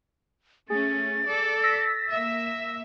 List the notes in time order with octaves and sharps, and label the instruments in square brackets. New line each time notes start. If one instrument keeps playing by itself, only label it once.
[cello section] A3 C#4 [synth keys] G#4 [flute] A6
[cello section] A4 D5
[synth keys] E6 A#6 B6
[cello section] A#3 E5